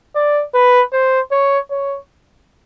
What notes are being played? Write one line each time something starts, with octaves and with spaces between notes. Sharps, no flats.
D5
B4
C5
C#5
C#5